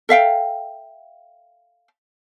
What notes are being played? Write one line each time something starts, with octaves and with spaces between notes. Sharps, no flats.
A4 E5 F5 G5